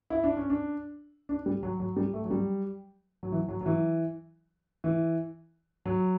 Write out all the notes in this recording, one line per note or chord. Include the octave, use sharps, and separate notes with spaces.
E4
D4
C#4
D4
D4
G3
F#3
F#3
G3
A3
F#3
G3
F#3
E3
F#3
F#3
E3
E3
F#3